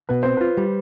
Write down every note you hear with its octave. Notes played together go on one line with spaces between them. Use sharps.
B2 B4
C4 C5
F4 B4
G3